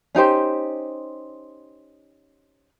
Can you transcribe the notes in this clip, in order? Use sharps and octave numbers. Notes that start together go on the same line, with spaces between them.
C#4 D#4 G4 C5